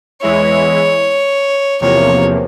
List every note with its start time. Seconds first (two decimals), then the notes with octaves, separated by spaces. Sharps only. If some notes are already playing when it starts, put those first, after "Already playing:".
0.22 E2 E3 G#3 E4 C#5
1.81 E2 C3 F3 A#3 C#5